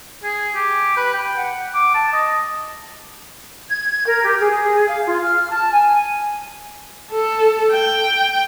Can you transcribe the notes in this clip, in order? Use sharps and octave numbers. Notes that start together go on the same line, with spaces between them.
G#4
G4
B4
G5
F#5
D6
A5
D#5
G#6
A#4
G4
G#4
F5
F4
F6
A5
G#5
A4
G5